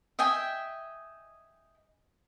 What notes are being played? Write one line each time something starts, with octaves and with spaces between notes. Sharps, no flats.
D#5 E5 G5 G#5